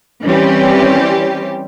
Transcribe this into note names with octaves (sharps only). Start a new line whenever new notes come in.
E3 G3 C4 C#4 G4